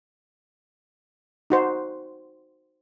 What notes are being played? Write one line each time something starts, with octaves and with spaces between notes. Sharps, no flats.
D#4 F#4 C5